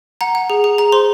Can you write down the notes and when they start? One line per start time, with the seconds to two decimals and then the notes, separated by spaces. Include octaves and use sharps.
0.21 F#5 A#5
0.35 F#5
0.50 G#4
0.64 G#4
0.78 G#4 A#5
0.92 C5 C6